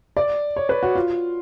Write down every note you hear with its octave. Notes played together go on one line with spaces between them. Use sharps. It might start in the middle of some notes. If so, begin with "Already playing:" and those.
D5
C#5
B4
F#4
F4